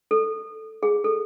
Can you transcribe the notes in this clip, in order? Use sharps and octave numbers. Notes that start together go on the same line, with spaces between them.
A4
G#4
A4